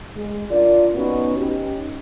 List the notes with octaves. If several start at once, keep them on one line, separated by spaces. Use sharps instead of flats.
G#3
D4 F4 A#4 D5
B3 C#4 D#4 F#4 B4
C#4 D#4 G4